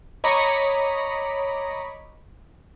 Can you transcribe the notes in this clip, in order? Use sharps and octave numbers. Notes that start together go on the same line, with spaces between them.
C#5 D#5 A#5 B5 C#6 D6